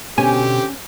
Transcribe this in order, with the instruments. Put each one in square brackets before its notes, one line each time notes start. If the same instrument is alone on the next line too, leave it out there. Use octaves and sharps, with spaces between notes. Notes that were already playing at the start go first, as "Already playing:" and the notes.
[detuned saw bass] B2 [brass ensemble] D3 C4 G4 [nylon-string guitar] C#4 [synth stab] G#5